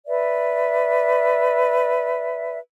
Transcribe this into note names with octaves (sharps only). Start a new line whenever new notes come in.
B4 D5 E5